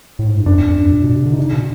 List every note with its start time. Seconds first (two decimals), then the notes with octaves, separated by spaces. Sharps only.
0.19 A2
0.28 G#2
0.38 G2
0.46 F#2 D4
0.57 E2
0.68 F2
0.81 F#2
0.92 A#2
1.04 B2
1.14 C3
1.26 D3
1.33 D#4
1.37 C#3 D4
1.53 B2